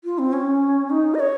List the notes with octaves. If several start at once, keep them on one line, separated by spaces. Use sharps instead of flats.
F4
C4
C#4
D#4
D#5
C#5